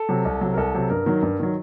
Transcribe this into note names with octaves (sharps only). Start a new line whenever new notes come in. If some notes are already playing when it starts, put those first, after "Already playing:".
Already playing: A4
C3 F#3
C2
C3 F#3
A#4
C2 A4
C3 F#3
G2 A#4
D#3 F#3
G2
D#3 F#3